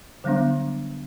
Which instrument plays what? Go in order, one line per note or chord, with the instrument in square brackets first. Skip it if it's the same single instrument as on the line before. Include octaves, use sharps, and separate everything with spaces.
[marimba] D3 F#3 G3 B3 D4